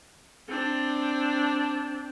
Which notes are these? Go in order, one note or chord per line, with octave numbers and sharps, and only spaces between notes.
C4 D4